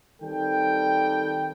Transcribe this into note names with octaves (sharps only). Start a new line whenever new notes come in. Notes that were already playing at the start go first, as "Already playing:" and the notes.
D#3 G3 C4 A4 G5